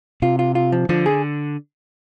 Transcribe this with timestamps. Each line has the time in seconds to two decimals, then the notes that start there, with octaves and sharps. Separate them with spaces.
0.22 C3 F4
0.39 F4
0.55 F4
0.72 F3
0.89 D3 F3
1.06 G#4